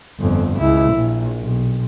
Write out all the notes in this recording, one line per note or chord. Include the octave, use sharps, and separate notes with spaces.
G1 F2
C#2 E4
A#1
B1